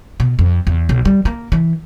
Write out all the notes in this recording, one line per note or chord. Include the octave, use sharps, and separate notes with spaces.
B2
F2
E2
B1
G3
A#3
E3